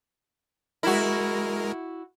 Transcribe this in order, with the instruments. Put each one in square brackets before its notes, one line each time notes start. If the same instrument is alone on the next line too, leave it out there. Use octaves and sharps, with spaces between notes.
[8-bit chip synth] G#3 A#4 [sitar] E4 F#4